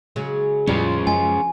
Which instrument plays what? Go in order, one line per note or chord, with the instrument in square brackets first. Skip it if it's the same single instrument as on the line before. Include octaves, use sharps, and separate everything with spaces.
[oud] C#3 F#3 G#3
[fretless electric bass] E2 A2 G3 [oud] F3 [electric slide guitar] C#4 F4 G#4
[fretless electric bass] F#2 G#3 [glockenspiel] G#5